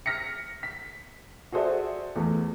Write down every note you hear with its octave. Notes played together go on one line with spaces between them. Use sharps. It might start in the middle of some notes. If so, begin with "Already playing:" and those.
F6 A#6 B6 C#7
B6
F#4 G#4 A4 C5 D5 E5
E2 A3